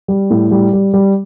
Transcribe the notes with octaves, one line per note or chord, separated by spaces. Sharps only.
G3
A2
G3
G3
G3